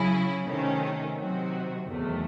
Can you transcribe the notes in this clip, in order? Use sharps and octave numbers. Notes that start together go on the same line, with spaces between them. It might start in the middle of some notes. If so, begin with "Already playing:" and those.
Already playing: C#3 F#3 C#4 E4 G#4
C3 D#3 A3 C#4
C3 D#3 F#3 C4 F#4
E2 C3 D#3 F#3 A3